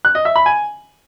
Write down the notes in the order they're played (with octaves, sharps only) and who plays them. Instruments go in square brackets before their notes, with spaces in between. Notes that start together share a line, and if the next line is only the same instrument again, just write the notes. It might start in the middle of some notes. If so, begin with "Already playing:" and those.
[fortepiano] F#6
D#5
E5
B5
G#5